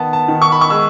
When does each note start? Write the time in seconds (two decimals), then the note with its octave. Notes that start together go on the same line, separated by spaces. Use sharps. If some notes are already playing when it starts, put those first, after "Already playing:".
Already playing: D#3 B3 A5
0.13 A5
0.28 D#3
0.42 C#6
0.52 B5
0.61 C#6
0.70 G#3 E6